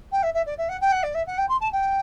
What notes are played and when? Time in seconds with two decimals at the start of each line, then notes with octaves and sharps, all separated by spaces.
0.11 G5
0.23 E5
0.34 E5
0.46 D5
0.58 E5
0.69 F#5
0.81 G5
0.92 F#5
1.03 D5
1.14 E5
1.27 F#5
1.38 G5
1.49 C6
1.60 A5
1.72 G5